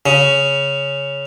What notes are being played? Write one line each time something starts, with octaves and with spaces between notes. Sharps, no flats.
C#3